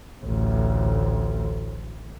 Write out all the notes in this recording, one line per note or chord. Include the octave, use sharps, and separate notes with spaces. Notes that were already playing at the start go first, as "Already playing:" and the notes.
A1 D2